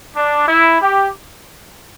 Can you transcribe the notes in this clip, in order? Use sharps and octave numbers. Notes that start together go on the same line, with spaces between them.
D4
E4
G4